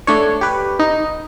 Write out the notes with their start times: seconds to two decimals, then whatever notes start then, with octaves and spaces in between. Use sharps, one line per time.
0.07 A3 D4 C#5
0.41 G4 B4
0.79 D#4